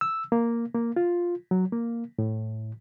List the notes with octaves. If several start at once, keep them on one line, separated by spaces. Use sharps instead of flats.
E6
A#3
A#3
F4
F#3
A#3
A2